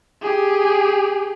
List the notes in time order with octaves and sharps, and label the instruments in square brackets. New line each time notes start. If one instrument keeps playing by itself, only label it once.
[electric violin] G4 G#4